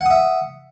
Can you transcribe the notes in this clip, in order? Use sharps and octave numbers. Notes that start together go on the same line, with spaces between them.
E5 F#5 D#6